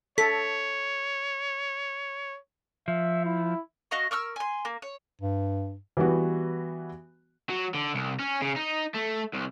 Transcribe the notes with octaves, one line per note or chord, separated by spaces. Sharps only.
A4 C#5 B6
F3 E5
E4
F#4 D#5 F5 C#6
A#4 C#6 E6 F6
G#5 C6
A#3
C#5
G2
E3 G3 B3 F#4
F#3
D3
C2
C#4
C#3
D#4
A3
C2